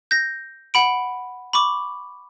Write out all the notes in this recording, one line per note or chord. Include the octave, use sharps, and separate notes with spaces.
G6 A#6
F#5 B5 D7
B5 C#6 D6